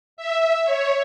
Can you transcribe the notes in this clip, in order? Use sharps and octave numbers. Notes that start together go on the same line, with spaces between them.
E5
C#5